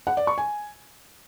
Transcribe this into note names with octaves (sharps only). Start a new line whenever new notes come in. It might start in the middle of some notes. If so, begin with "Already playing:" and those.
F#5
D5
C#6
G#5